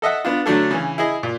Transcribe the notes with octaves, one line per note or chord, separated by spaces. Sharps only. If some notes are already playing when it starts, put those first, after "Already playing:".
A4 D#5 E5 F#5
B3 D4 F4
D3 F#3 A3 D4 A4
C#3 E3
E4 G#4 D#5
A#2